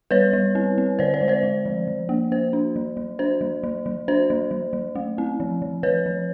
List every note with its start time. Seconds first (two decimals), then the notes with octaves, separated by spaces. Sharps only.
0.11 G3 B4 C#5
0.33 G3
0.55 C4
0.78 C4
0.99 D3 C5 D5
1.14 C5 D5
1.21 G#3
1.28 C5 D5
1.43 G#3
1.65 F3
1.88 F3
2.09 A#3
2.32 A#3 C5
2.53 D4
2.76 F#3
2.97 F#3
3.19 D4 C5
3.41 F#3
3.63 F#3
3.86 F#3
4.08 D4 C5
4.30 F#3
4.51 F#3
4.73 F#3
4.95 A3
5.18 C4
5.40 F3
5.62 F3
5.83 F3 B4 C#5
6.06 F3